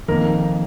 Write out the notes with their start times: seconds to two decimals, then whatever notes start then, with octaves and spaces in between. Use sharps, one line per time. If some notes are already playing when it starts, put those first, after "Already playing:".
0.08 F2 D#3 A#3 A#4